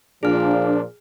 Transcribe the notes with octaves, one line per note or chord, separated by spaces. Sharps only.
A#2 F3 D4 G#4 F6